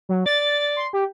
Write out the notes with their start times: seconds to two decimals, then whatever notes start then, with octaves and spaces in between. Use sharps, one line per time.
0.09 F#3
0.26 D5 A6
0.77 C6
0.93 G4